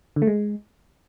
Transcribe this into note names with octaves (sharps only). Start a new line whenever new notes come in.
D3
A3
G#3